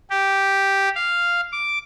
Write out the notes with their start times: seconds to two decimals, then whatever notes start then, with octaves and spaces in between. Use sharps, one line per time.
0.10 G4
0.95 F5
1.52 D6